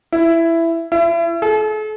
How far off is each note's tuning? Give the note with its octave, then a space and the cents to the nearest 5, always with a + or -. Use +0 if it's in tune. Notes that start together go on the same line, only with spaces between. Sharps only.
E4 +10
E4 +35
A4 -45